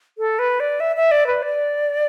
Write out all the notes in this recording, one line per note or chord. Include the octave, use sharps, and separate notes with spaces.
A4
B4
D5
E5
E5
D5
B4
D5